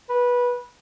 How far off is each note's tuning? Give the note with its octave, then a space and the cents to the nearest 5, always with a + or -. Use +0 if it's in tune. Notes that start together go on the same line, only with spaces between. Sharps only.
B4 -15